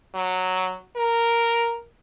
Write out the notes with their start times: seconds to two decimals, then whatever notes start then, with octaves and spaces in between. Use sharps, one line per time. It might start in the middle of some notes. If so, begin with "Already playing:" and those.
0.15 F#3
0.96 A#4